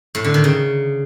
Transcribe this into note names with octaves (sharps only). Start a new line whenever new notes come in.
A2
D3
D#3
C#3